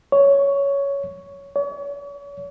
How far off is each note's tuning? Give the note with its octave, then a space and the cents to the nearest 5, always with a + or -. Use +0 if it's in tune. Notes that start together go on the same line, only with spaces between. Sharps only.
C#5 +10
C#5 +40